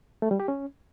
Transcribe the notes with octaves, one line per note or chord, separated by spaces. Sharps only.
A3
G3
G4
C#4